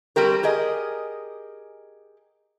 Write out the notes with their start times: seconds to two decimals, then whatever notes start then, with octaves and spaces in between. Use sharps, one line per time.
0.16 G3 C4 G4 A#4
0.43 G4 G#4 A#4 D#5